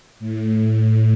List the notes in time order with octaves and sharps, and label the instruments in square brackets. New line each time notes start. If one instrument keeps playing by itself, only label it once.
[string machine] A2